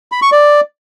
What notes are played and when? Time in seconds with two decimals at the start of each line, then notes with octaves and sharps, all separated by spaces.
0.12 B5
0.22 C#6
0.32 D5